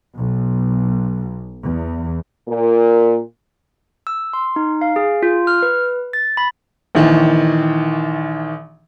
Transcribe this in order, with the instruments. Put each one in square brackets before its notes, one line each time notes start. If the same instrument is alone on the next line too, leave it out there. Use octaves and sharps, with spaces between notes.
[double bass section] B1
E2
[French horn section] A#2 A#4
[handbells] E6
C6
D#4
F5
G#4
F4
F6
B4
A6
B5
[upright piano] A#1 D#3 E3